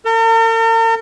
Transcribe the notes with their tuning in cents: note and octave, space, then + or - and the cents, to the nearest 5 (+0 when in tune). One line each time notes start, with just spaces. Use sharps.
A#4 -45 A#5 -45